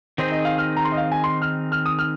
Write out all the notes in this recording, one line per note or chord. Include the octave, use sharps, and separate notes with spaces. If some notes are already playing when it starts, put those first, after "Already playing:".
D#3 C4 D#4 G#4 C5
D#5
F5
F6
A#5
C6
D#5
F5
G#5
C6
F6
F6
D#6
F6